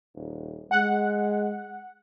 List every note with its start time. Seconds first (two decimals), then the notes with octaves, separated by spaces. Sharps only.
0.15 D#1
0.71 G#3 F#5